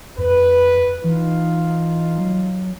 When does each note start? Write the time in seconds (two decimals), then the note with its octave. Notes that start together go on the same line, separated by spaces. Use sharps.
0.18 F2 B4
1.04 E3 D#4 F4
2.18 F#3